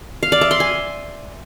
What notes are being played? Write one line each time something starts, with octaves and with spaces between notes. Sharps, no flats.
F5
D5
E5
C6
G#5